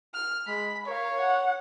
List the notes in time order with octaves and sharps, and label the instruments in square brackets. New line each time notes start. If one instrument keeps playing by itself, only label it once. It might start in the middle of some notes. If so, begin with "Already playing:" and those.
[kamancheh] F6
[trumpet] G#3 [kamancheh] B5
[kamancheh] A#4 F5 [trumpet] C#5
[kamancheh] F#5